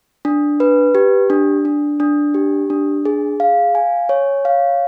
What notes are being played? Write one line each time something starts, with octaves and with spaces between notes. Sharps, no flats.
D4
B4
G4
D4
D4
D4
G4
D4
G#4
F5
G#5
C#5
F5